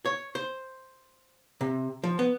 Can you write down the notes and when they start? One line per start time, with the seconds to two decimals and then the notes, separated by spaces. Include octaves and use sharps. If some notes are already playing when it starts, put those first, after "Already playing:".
0.05 C#5
0.35 C5
1.61 C3
2.03 F3
2.19 B3